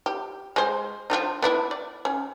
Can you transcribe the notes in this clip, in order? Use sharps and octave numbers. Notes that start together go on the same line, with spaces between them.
G4
G#3 C5
F3 D4 D#4
B3 D4 E4
D5
C#4